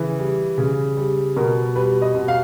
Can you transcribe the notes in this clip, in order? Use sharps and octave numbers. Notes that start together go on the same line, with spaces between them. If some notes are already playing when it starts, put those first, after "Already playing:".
Already playing: C#3 E3
G3
C#3
G3
B2 A#4
G3 B4
D#5
B2
F5